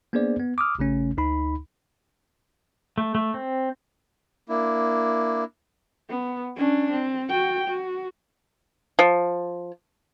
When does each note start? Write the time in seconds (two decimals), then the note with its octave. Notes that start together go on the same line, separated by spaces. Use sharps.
0.13 A#3 B3 D4 G#4 C5 D5
0.40 B3
0.58 D6 D#6 F6
0.79 A1 C#3 A3 C#4
1.17 D2 D#4 B5
2.98 A3
3.15 A3
3.34 C4
4.49 A#3 D4 E4
6.09 B3
6.56 C#4 D4
6.91 C4
7.30 F#4 G5
7.68 F#4
8.99 F3